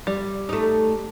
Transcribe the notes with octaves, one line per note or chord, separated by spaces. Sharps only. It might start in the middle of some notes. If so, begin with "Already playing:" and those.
G3
A3 D#4